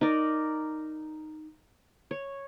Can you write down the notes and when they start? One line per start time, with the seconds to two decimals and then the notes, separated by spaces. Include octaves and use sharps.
0.01 D#4 A#4 D5
2.11 C#5